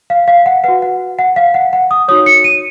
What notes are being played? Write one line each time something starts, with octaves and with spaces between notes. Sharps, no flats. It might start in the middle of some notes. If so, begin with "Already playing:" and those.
F5
F5
F#5
F#4 B4 F#5
F#5
F#5
F5
F#5
F#5
D#6
D#4 F#4 C#5 D#6
C#7
D#7